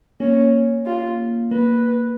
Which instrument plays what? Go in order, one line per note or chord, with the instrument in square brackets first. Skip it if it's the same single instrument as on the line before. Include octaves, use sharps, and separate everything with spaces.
[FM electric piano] A#3 [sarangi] C#4
[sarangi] F4
[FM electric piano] A#3 [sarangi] B4